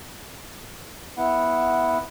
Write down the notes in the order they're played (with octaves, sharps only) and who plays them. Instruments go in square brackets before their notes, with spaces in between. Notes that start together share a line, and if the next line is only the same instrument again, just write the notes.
[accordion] B3 E4 F#5